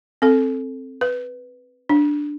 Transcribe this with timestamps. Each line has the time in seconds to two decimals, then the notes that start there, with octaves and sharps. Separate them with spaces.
0.22 C4 A4
1.01 B4
1.89 D4